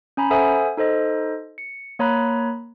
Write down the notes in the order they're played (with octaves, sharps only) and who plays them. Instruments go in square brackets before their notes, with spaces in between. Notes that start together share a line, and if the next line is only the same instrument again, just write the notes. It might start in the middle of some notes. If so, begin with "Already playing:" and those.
[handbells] C#4 G#5 A#5 B5
A4 C5 E5 F#5 G#5 D#6
D#4 A4 C5 D#5
C#7
A#3 C#5 A#5 B5 F#6